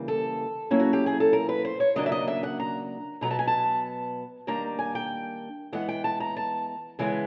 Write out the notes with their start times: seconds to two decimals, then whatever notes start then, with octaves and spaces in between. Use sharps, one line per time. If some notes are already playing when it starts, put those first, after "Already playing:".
Already playing: C#3 E3 G3 A#3
0.08 A4
0.71 F#3 A#3 C#4 E4
0.80 F#4
0.93 G4
1.06 G#4
1.20 A4
1.33 A#4
1.49 B4
1.65 C5
1.80 C#5
1.96 C#3 F#3 A#3 D4 D#5
2.06 E5
2.12 D#5
2.28 E5
2.43 F#5
2.60 A#5
3.21 B2 F#3 B3 A#5
3.30 A5
3.39 G#5
3.47 A5
4.47 D#3 G3 A#3 D4 A#5
4.79 G#5
4.95 G5
5.73 E3 G#3 B3 F#5
5.89 G5
6.04 A5
6.20 A#5
6.36 A5
6.99 C#3 E3 G#3 B3 G#5